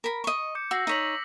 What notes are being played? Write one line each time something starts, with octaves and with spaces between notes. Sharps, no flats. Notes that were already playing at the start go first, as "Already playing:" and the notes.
A#4 B5
D#5 C#6
D6 G6 C#7
F#4 E6 A#6 C7
D#4 C#5 A#6 B6 F#7